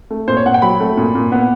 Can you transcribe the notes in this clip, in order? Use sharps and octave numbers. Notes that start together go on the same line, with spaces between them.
A3
A#2 C5
C#5
A#2 F#5
G5
F#3 B5
A3
A#2
A#2
B3